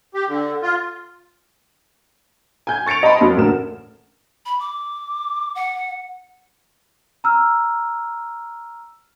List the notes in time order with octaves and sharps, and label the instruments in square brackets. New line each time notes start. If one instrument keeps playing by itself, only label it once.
[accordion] G4
D3
F4
[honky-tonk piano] G#5 G6 G#6
C#6 A6 C#7 D7 F7
D#5 A5 B5 C6
F2 F#3 A#3 F#4
A1 D2 A#4 E7
[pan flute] B5
D6
F#5
[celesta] A#5 E6 F6